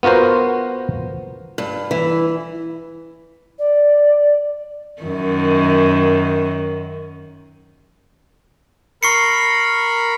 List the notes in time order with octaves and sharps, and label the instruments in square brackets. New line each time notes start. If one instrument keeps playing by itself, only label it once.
[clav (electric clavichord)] B3 F4 F#4 A#4 C5
[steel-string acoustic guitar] G2
E3
[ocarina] D5
[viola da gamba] F#2 D#3
[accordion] A#4 B5 [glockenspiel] C#6 C7 C#7